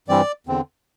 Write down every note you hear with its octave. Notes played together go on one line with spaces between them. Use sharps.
G2 E3 G3 C4 D5
E2 D3 C4